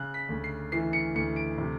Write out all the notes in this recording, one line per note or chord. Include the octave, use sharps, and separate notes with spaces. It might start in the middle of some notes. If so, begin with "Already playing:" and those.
Already playing: C#3 F#6
B6
D2
C7
E3 C7
C#7
D2 C#7
D7
C3